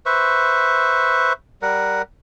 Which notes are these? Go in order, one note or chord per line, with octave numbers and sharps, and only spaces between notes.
B4 C5 E5 C#6
G3 A#4 F#5